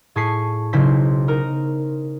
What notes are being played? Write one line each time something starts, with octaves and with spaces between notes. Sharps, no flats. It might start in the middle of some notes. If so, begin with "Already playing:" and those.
A2 G#4 A5 C#6 B6 C7
B1 C#3 E4 C5 B6
D#4 A#4 A#5